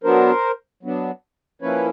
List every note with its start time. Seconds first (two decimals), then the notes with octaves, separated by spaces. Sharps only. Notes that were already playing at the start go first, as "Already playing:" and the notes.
0.04 F#3 B3 D4 A#4 C5
0.83 F#3 B3 D4
1.62 F3 A#3 C#4 E4 B4 C#5